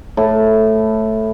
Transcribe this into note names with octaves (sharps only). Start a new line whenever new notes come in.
A2